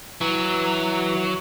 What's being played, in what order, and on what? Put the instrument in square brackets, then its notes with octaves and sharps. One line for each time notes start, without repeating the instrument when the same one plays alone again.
[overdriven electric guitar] E3 [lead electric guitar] F#3